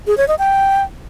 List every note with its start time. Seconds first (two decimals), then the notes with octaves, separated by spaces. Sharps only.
0.07 G#4
0.17 C#5
0.28 D#5
0.39 G5